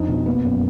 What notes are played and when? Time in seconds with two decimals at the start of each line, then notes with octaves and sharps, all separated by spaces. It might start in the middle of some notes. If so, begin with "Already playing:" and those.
Already playing: F2 D4 D#4
0.08 B2
0.26 A#3 B3
0.44 F#2